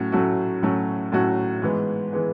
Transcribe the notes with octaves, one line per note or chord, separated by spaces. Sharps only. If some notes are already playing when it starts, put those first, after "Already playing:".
Already playing: A2 F#3 A3 C#4 F#4
A2 F#3 A3 C#4 F#4
A2 F#3 A3 C#4 F#4
A2 F#3 A3 C#4 F#4
G#2 E3 G#3 B3
E3 G#3 B3